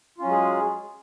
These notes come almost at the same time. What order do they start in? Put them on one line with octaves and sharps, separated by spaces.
F4 C#4 F#3 G#3 G#4